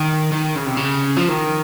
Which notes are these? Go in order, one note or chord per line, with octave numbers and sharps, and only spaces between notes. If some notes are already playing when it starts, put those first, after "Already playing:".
Already playing: D#3
D#3
C#3
C3
C#3
F3
D#3